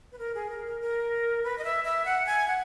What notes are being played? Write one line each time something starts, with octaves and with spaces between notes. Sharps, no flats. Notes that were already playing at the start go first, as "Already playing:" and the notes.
B4
A#4
G#4
A#4
A#4
A#4
B4
D#5
E5
E5
F#5
G#5
F#5